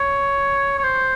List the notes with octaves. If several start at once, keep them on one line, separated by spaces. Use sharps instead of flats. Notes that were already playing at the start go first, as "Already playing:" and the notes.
Already playing: C#5
C#5
C5